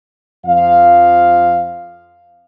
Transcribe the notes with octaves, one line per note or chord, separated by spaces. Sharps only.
F2 F3 F5